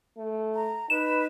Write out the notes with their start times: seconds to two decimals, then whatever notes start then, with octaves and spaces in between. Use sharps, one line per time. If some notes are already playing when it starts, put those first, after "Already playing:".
0.18 A3
0.55 A#5
0.90 D#4 B4 E7